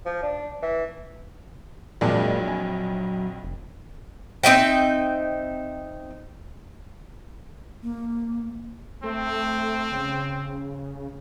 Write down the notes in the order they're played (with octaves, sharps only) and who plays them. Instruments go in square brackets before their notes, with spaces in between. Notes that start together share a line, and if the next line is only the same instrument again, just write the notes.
[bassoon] F3
D4
E3
[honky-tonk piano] A#1 F2 [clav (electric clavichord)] A#2 G#3 D4 [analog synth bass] F#3
[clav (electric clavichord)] G#5
[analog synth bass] F1
[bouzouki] C4 D#4 E5 G5
[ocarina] A#3
[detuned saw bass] A3 [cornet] C4
[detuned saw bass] C#3